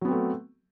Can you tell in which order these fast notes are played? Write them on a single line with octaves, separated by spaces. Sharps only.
F#3 B3 C4 A3